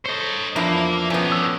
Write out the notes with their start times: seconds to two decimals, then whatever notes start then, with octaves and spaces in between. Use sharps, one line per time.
0.06 A4 C5 C#5 D#5
0.56 E2 F3 A#3 D4 E4
1.10 A3 B3 C#4 G5
1.32 D6 E6